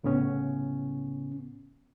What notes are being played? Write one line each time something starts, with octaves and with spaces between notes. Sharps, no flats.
C2 A2 C#3 B3 C#4